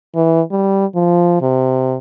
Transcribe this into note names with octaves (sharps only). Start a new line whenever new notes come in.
E3
G3
F3
C3